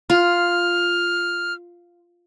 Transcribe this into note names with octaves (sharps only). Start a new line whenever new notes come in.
F4 F6